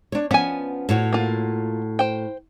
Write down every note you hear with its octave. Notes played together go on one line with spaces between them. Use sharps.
D4 C#5
F3 B3 C#4 G#5
A2 F#4 C#5
A#3 F4
C5 G5